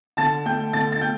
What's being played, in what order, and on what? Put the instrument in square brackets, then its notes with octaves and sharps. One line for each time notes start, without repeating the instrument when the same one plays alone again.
[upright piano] D3 A5 A6
A3 G5 G6
D3 A5 A6
A6
A3 G5 G6